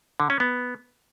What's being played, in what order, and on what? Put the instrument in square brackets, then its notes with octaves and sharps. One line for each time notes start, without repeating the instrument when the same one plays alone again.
[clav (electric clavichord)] D3
C#4
B3